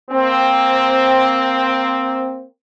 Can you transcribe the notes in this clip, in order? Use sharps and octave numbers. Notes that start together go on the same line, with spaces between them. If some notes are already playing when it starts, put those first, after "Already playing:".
A#3 C4